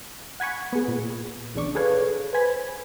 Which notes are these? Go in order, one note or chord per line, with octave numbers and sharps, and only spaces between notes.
F#5 G#5 B5 C#6
B3 G#4
A#2
A#1 E2 C#3 D4 C#6 D6
G#4 A4 B4 C#5 F5
B4 C5 G#5 B5